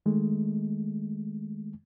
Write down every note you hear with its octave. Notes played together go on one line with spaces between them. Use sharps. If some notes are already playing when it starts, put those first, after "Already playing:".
D#3 G#3 A3